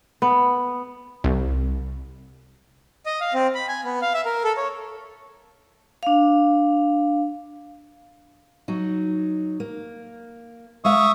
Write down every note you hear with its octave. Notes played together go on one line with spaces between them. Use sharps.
B3
C2
D#5
F5
C4
B5
G#5
B3
F5
E5
A#4
A4
C#5
D4 F5
F#3 D#4
A#3
G#3 E5 F5 C#6 D#6